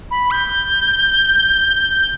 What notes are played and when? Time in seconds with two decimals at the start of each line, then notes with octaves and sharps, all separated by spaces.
0.11 B5
0.31 G6
2.00 G6